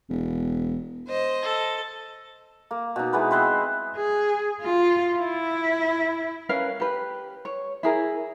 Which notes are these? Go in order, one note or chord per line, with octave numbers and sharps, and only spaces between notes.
E1
C5 D#5
A4
A#3
B2 D#4
E3 G#3 B3 B4
C4 B4 C5 D#5
G#4
F4
E4
C#4 A#4 B4 F5
G4 B4
C#5
E4 G#4 A#4